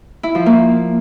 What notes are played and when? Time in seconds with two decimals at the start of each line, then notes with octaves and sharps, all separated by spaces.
0.23 E4
0.35 F3
0.46 A#3